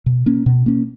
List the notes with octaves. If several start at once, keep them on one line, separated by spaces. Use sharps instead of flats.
B2
A#3 C#4
B2
A#3 C#4